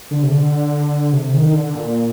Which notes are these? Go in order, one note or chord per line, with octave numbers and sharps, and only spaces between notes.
D3
C3
D3
C3
D#3
D#3
D3
A#2